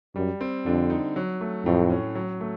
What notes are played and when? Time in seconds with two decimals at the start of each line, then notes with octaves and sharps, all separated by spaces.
0.16 F#2 G3
0.41 C4
0.66 F2 D3
0.90 D#4
1.16 F#3
1.41 A3
1.66 F2 A2
1.90 C#4
2.15 F#3
2.41 A3